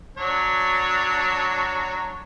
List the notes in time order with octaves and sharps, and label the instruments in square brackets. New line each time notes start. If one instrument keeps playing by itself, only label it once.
[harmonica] F#3 D4 C#5